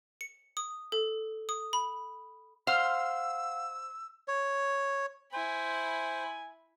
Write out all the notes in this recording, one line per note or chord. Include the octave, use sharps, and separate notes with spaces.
C#7
D#6
A4
D#6
B5
C5 F5 F#5 E6 F6
C#5
E4 C5 G#5 B5